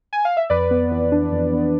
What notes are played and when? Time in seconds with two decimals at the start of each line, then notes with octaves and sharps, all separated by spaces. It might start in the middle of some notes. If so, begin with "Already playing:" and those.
0.13 G#5
0.25 F5
0.37 E5
0.50 F2 B4 D5
0.71 B3
0.91 E3
1.12 D4
1.32 F2
1.53 B3